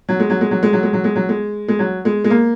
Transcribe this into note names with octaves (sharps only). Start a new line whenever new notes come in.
F#3
G#3
F#3
G#3
F#3
G#3
F#3
G#3
F#3
G#3
F#3
G#3
G#3
F#3
G#3
G#3
A#3